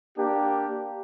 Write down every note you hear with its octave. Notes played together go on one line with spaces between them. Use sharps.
A#3 D4 G4